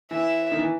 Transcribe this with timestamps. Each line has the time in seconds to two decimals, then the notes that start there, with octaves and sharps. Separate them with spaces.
0.11 E3 E5
0.52 D#3
0.59 E3